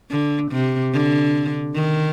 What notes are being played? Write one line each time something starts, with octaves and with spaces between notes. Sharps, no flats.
D3
C3
D3
D#3